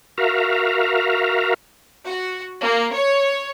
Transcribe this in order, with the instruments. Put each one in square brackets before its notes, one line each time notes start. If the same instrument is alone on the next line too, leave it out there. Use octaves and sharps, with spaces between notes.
[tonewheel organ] F#4 A#4 E5 F5 A#5
[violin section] F#4
A#3
C#5